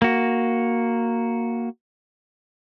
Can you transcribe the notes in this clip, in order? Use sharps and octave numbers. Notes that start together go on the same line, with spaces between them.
A#3 F#4